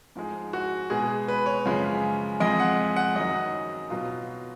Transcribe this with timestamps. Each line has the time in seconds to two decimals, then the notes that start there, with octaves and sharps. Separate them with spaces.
0.16 G#2 F3 G#3
0.53 F#4
0.90 B2 G#3 G#4
1.28 B4
1.46 C#5
1.65 F#2 C#3 F3 G#3
2.40 F2 F3 G#3 D#5
2.60 F#5
2.96 F#5
3.15 F#2 D#3 F#3 D#5
3.90 B2 F#3 F4